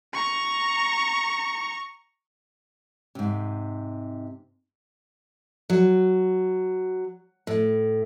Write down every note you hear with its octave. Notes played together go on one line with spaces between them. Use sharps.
A#5 C#6
G#2 C3
F#3
A2